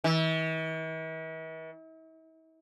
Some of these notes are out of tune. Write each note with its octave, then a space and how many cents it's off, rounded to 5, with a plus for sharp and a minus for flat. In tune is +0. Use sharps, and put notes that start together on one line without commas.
E3 -45